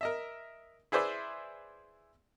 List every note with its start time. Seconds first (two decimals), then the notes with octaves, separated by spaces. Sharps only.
0.01 A#4 D#5 E5
0.92 E4 G#4 B4 C5 D5 E5